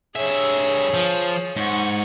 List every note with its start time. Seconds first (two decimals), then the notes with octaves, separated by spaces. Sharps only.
0.16 G2 G#4 C#5 E5
0.94 F3
1.56 G#2 F#5 C#6